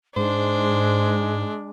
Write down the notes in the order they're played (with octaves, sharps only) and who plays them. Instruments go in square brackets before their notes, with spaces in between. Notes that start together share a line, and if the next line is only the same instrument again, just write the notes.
[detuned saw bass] G#2 [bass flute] G#3 [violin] D4 [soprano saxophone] C5